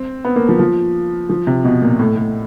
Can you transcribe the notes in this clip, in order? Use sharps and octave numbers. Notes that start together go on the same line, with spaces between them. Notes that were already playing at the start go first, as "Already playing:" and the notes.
Already playing: C4
B3
A#3
F3
F3
F3
C3
B2
A#2
A2
A2